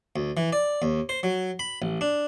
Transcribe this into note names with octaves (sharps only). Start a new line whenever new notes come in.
D2
E3
D5
D#2
C5
F#3
B5
A1
D4